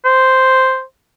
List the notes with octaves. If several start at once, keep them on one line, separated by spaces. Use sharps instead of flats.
C5